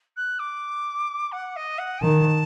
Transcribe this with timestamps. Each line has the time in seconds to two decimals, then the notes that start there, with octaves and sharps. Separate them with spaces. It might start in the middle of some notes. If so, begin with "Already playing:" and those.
0.16 F#6
0.39 D6
1.32 F#5
1.56 D#5
1.78 F#5
2.02 D#3 A5